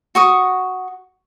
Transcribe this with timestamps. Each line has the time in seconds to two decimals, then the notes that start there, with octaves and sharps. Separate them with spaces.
0.15 F#4 C#6 D#6